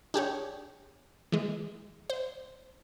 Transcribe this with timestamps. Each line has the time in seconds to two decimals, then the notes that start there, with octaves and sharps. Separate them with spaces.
0.14 D4 G4 G#4 C#5
1.32 E3 G#3
2.10 C5